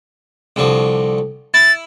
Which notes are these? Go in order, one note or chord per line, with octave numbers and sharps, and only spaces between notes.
C2 D3 F3
E4 A6